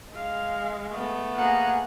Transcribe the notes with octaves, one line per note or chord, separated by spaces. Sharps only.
G#3 F5
A3 B3
A#3 G#4 F#5 A#5